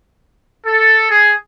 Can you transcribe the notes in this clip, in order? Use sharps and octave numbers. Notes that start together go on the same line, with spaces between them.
A4
G#4